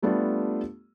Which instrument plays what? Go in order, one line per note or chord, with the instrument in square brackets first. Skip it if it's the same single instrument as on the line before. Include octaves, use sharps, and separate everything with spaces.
[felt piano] G3 A3 B3 D4 F4